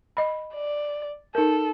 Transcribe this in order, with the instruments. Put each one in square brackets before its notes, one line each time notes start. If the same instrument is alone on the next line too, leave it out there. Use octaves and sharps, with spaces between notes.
[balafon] D#5 B5
[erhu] D5
[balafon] D#4 A#4 [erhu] A4